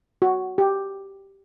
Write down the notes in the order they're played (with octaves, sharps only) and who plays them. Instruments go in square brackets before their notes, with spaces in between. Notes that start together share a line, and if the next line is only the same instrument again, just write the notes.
[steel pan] F#4
G4